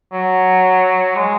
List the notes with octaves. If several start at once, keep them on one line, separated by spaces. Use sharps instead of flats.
F#3
G#3